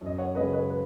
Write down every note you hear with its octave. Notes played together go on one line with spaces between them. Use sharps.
F#2 D#5
C#5 F#5
C#3 G#3 B4 D#5
B4 D#5
B4